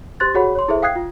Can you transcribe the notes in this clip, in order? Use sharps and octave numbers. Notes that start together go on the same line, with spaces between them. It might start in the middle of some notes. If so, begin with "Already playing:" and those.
G4 C5 C6 F#6 A6
F#4 G#4 C#5 F#5 B5
C#5 C6
E4 G#4 A4 C5 E5
F5 G5 D#6 F#6 G#6 C7
F4